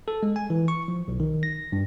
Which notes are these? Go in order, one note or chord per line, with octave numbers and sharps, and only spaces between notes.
A4
G#3
G#5
E3
C#6
F3
B1
D#3
A#6
G2